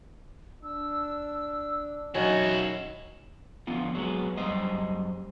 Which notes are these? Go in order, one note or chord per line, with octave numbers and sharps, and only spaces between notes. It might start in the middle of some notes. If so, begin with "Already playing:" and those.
D4 E6
D#3 F#3 C#4 E4 F#4 C#5
D3 F3 B3 F4
F#3 G#3 B3
F#2 G3 C5 D#5